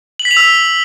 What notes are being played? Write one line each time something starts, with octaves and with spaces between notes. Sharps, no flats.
F#7
B6
F7
E6